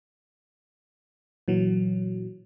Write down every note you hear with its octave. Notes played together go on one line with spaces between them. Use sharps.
A#2 E3 F#3